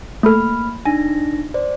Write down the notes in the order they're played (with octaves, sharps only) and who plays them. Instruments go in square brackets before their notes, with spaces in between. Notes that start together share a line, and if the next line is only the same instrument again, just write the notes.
[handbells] A3 A4 [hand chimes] A#3 B5 F6
[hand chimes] D4 D#4 A#6 [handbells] G#5
[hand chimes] C5 D5